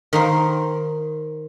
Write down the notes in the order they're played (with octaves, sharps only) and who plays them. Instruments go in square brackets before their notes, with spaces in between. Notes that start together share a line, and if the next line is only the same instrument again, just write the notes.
[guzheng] D#3 A#4 C5